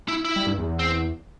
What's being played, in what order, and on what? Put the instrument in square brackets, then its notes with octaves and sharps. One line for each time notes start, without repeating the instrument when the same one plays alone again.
[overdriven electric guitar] E4
E4
[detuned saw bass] G3
G2
E2
[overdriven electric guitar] C4